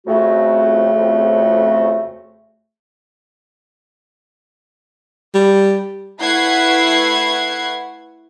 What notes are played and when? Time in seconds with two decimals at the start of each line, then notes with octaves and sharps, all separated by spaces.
0.07 F2 C#3 A3 F#4
5.34 G3
6.21 A3 E4 B4 F#5 G#6 C7